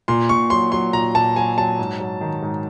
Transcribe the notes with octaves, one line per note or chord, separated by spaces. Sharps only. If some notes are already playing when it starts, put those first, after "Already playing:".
A#2 C6
A#2 C#6
F#3 C6
F#3 C6
A#2 A#5
A#2 A5
F#3 G#5
F#3 A5
G#2
F#3
D#3
G#2